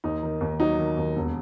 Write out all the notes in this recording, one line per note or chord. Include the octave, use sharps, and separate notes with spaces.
D#2 D#4
D#3
D#2
F#3 D#4
D#3
D#2
E1